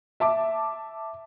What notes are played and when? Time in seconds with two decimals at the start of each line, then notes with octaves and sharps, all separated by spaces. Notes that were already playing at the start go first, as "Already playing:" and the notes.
0.20 E5 A5 D6